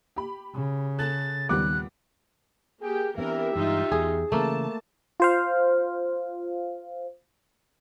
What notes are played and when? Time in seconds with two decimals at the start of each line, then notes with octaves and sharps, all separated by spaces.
0.16 G4 B5
0.55 C#3
0.99 A4 F#6 A6
1.49 D#2 A#2 G3 B3 D6 F#6
2.82 A#3 G4 G#4 G5
3.18 E3 B3 C4 D4 G4 A#4 E5
3.56 G2 E3 G#3 D#4 F4
3.92 E2 G#4
4.32 C#3 E3 A3 A#3 C#4 A5
5.20 F4 C5 F5